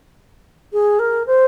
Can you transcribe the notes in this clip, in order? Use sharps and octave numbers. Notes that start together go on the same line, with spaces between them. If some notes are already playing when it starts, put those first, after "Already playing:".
G#4
A#4
C5